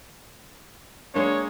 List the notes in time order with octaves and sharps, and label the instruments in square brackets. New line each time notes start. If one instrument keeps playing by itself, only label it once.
[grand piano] G#3 A#3 D4 [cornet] C#5